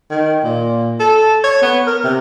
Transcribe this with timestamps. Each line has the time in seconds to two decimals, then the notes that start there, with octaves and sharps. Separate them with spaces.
0.10 D#3
0.44 A#2
1.00 A4
1.44 C#5
1.62 B3
1.87 A#4
2.04 C3